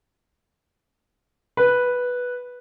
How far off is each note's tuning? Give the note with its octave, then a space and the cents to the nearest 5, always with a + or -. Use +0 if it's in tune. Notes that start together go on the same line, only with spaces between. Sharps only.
B4 -5